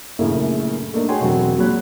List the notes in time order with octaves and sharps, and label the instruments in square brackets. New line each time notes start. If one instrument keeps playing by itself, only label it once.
[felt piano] A#1 F#2 C#3 A3 A#3 E4
A3 A#3 D4 D#4
F#4 G#4 C#5 G5 G#5 C6
E1 F#3 C4 F#4
A#2 F#3 G#4 C#5 B5 F#6